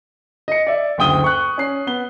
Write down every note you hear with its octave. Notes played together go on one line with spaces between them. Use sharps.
D#5 C#7
D5 E5
F#1 D2 G5 D#6 G7
C#6 F#6
C#4 C7
B3 G7